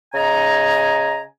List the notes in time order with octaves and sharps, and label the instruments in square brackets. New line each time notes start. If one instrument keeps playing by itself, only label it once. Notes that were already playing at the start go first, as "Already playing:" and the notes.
[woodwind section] C#3 D#5 G#5 A#5